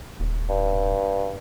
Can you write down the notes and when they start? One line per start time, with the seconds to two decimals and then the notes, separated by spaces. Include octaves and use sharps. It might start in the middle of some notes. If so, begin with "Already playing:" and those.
0.20 D#1
0.49 G2